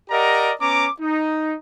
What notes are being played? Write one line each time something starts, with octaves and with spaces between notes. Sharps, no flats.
G4 A#4 D5 D#5 F#5 A#5
B3 C#4 A#5 D6
D#4